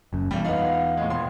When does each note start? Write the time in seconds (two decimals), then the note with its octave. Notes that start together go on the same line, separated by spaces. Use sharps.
0.13 F#1 F#2
0.31 B1 E2 G3
0.44 B3 D#4 F4 F5 F#5
0.97 A2 G#3
1.10 E1 C3 C6